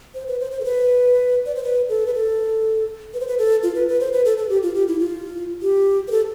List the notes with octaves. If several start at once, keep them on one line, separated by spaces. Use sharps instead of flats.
C5
B4
C5
C5
A4
B4
D5
C5
B4
A4
B4
A4
B4
C5
B4
A4
F4
B4
B4
C5
B4
A4
A4
G4
F4
G4
E4
F4
G4
B4
A4